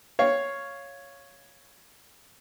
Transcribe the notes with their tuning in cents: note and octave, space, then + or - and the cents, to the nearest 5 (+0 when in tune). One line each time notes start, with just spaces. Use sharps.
C#5 +0 F5 +0